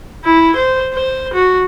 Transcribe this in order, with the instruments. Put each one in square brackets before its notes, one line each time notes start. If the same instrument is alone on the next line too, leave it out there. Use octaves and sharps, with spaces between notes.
[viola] E4
C5
C5
F#4